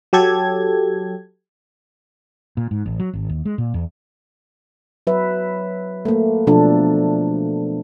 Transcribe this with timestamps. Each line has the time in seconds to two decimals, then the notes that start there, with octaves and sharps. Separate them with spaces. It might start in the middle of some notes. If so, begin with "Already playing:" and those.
0.13 F#3 G4 A4 G#6
2.57 A#2
2.71 G#2
2.86 A1
3.00 F#3
3.13 G#1
3.29 D#2
3.45 G#3
3.58 A#2
3.74 E2
5.07 F#3 B4 E5
6.05 A3 A#3
6.47 B2 F3 D4 A4